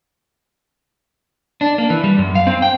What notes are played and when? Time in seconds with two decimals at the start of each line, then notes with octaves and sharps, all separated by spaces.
1.61 D4
1.78 A#3
1.90 E3
2.04 G3
2.19 F#2
2.35 F5
2.47 C4
2.62 G5